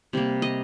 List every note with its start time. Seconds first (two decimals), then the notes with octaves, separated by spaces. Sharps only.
0.13 C3 G3 A#3
0.42 D#5